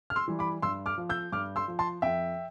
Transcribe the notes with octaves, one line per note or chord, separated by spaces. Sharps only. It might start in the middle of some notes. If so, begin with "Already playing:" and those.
F6
C6 E6
E3 G3
B5 D6
G2 C6 E6
D6 F6
F3
E6 G6
G2 D6 F6
C6 E6
F3
A5 C6
F2 E5 G5